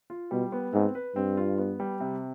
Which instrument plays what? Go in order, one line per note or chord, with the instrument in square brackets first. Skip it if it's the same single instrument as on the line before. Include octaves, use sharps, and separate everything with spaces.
[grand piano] F4
[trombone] B2 [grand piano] G3
[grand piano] B3
[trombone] G#2 [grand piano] C4
[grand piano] B4
[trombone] G2 [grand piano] C4
[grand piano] F4
B3
G3
C3